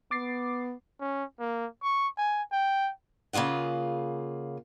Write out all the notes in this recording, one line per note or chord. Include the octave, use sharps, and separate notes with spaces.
B3 D6 A6 C7
C#4
A#3
C#6
G#5
G5
C#3 A#3 F4 G#4 F#5